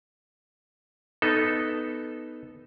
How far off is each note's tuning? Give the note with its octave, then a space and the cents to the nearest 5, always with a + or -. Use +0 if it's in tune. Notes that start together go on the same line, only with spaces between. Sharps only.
B3 +0 D#4 +0 A4 +0